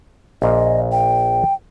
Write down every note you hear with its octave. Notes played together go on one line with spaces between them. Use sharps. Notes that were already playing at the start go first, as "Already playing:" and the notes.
A#1 A#2 D#5 F5
G5